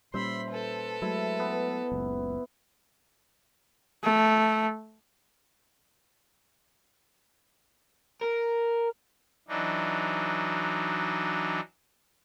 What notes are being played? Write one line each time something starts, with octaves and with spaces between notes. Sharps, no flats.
A#2 G3 C#4 C5 E5 B5 C6
A4 B4
F#3 G#3 A3 E4
B3
F#1 C#2
A3
A#4
E3 F#3 D4 D#4